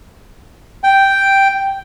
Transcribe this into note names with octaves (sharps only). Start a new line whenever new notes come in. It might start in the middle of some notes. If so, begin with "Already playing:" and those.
G5